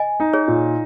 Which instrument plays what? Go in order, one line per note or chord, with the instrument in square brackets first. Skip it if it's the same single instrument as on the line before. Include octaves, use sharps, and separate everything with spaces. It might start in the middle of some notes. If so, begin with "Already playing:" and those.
Already playing: [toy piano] D#5 G#5
[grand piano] D#4
[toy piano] G#4 C#5
[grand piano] A#2